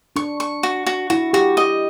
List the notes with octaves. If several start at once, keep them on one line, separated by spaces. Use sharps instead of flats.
D4 C#6
C#6
F#4
F#4
E4 F#4
F#4 G4
D#5